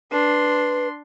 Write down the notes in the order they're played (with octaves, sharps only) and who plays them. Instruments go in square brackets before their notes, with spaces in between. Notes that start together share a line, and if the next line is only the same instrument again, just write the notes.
[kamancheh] D4 C6 [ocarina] B4